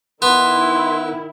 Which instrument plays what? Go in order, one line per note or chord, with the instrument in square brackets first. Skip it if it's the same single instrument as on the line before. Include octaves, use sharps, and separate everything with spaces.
[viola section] D#3 E4 [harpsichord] B3 [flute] C6